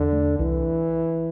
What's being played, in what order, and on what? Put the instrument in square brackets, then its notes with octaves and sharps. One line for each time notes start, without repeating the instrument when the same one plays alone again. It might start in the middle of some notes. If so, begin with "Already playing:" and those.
Already playing: [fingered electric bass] E2 [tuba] D3
[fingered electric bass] A3
[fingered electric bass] C2 [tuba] E3